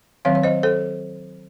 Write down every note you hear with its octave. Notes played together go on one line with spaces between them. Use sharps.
D#3 F#3 C4 C#5 F5
C#5
C5 D#5
A4 C5